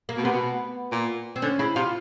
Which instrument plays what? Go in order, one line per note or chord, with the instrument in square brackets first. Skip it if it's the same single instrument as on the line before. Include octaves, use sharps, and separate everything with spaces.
[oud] A#3
[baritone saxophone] B2
[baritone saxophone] C3 [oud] B3
[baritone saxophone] B2
A#2
[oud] C4
[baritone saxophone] D3 [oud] C#4
[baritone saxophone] C#3 [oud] E4
[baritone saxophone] C3 [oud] F4